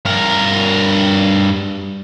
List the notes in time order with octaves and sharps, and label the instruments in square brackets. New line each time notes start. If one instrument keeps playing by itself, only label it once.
[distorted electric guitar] G2 A#4